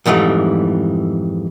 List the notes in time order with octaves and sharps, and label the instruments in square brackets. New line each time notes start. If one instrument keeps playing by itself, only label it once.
[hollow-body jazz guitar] F2 G#2 E3 G3 A3